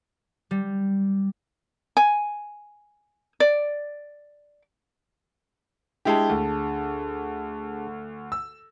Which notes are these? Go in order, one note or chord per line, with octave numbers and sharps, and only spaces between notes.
G3
G#5
D5
G#3 D4 E4 G4 G#4 A5
D2
E6